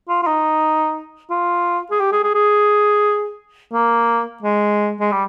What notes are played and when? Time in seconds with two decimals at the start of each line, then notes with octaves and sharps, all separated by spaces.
0.09 F4
0.23 F4
0.27 D#4
1.30 F4
1.91 G#4
2.00 G4
2.12 G#4
2.23 G#4
2.35 G#4
3.73 A#3
4.42 G#3
5.00 G#3
5.12 G3